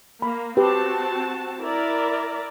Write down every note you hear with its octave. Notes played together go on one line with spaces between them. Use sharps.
A#3 B5
C4 F#4 G4 B4 A5
E4 A#4 D5